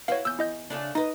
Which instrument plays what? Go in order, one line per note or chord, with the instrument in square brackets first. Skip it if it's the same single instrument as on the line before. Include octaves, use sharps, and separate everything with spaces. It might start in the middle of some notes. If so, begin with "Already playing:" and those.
[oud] E4 F#4 B4 [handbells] C#5 F5
[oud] E2 [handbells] E6 G6
[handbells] E4 D#5 G6
[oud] C#3 A3 D4
[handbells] D#4 [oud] B4 D#5